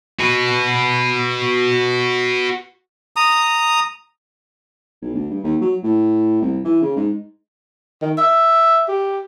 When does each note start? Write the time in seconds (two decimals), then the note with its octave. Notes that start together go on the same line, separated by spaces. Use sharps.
0.19 F#4 B4
3.16 A#5 D#6
5.02 B1
5.14 D2
5.31 G2
5.44 D#2
5.61 F#3
5.83 A2
6.42 C2
6.64 E3
6.82 C#3
6.97 G#2
8.02 D#3
8.18 E5
8.88 G4